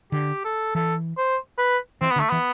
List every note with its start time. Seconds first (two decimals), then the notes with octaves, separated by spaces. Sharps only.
0.12 D3 G4
0.44 A4
0.75 E3 A4
1.18 C5
1.58 B4
2.01 E3 C4
2.11 B3
2.16 D3
2.20 A3
2.30 E3 B3